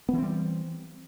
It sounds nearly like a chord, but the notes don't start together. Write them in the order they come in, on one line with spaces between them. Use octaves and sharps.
B3 E3 C4 G3